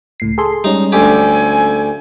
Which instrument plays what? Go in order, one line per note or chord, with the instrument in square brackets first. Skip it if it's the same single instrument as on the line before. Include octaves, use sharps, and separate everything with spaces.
[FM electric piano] C#2 A2 C7
G#4 A4 C6
[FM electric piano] G3 G#3 C#4 [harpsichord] D#4
[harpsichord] D2 G4 [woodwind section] F3 A4 G#5